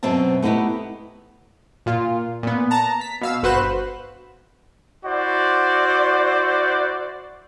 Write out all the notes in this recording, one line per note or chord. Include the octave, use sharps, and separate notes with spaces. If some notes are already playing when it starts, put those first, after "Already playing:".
F#2 B2 C4 E5 A5
A3 B3 D#4 E4 G4 B4
A#2 F4
A#2 B3
A5 A#5
B6
B2 F5 E6
G1 F#4 B4 C5 F#6 E7
E4 F#4 C5 D5